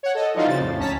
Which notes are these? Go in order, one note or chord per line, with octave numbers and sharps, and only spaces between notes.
C#5 F#5
A4 D#5
E3 F3 G3 D#4 F4 F#4
C#3 C4 A6
F2 A2
D2 C#4 A5 A#5 B6